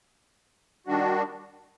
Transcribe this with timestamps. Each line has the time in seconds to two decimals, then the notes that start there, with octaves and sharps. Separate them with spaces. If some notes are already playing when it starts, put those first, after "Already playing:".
0.87 D#3 G3 D4 F#4